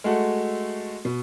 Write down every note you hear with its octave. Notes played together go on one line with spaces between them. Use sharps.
G#3 A3 F#4 A4
B2